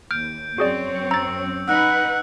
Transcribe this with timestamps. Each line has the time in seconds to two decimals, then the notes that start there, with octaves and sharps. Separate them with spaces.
0.11 D#2 F6 G6 D7
0.58 F#2 C4 F#4 G#4 C#5 D5
1.11 A#5 E6 A6
1.68 D#4 B4 F#5 E6 F#6